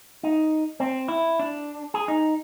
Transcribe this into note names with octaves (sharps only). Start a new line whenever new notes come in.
D#4
C4
E4
D4
G#4
D#4